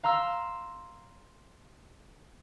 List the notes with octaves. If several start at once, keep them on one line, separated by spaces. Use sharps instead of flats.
F5 A#5 C6 E6